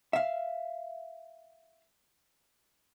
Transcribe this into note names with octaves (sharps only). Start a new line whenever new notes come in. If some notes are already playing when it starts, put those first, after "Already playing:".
E5 F5